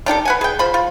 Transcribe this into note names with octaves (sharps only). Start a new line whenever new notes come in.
D#3 D4 G4 A4
B4 F#5 G#5
G#4 G5
F3 C5 B5
F4